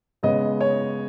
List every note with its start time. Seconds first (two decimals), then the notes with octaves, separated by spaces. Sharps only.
0.23 C#3 G#3 B3 D#5
0.61 C#5